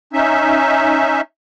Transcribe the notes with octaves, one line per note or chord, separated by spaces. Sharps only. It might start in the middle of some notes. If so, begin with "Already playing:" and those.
C#4 D#4 E5